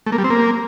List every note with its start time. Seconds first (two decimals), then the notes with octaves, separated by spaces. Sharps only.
0.06 A3
0.12 A#3
0.18 G3
0.24 C4
0.30 A#3